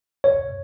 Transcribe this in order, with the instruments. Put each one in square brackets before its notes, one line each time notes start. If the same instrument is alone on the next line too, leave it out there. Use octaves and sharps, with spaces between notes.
[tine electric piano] C#5